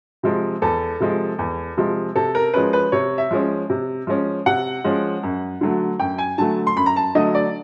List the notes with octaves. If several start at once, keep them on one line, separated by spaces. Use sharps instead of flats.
C3 F3 G#3
E2 A4
C3 F3 G#3
E2
C3 F3 G#3
C3 A4
A#4
F3 G#3 C#4 B4
B4
C3 C#5
E5
F3 G#3 C#4
C3
F3 G#3 C#4
C3 F#5
F3 G#3 C#4
F#2
D3 F#3 A3
F#2 G5
G#5
D3 F#3 A3 A5
C6
F#2 B5
A#5
A5
D3 F#3 A3 D#5
D5